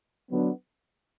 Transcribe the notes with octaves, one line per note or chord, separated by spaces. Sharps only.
D3 F#3 B3